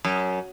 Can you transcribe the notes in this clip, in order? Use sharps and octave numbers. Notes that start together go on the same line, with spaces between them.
F#2